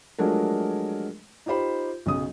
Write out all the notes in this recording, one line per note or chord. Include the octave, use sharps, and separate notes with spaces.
F3 F#3 G#3 A3 D4 A#4
D#4 F4 G4 C5 B5
B1 C#3 D#6